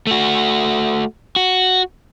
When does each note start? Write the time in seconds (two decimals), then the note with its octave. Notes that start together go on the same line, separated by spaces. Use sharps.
0.07 A3 F#4
1.36 F#4